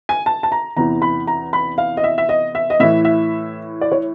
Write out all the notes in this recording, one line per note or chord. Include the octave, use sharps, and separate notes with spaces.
G#5
A5
A5
A#5
E2 C3 E3 A#5
B5
A#5
B5
F5
D#5
E5
E5
D#5
E5
D#5
A2 E3 E5
E5
D5
C#5